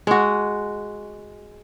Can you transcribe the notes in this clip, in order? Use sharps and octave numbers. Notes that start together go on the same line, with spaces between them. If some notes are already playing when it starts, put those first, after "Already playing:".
G#3 F#4